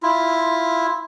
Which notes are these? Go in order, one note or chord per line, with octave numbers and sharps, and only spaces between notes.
E4 F4